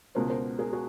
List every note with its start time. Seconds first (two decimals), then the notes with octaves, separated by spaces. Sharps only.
0.15 C#2 B2 G#3 B3 A#4 C5
0.29 A#4 C5
0.59 G#4 A#4
0.73 F#4 G#4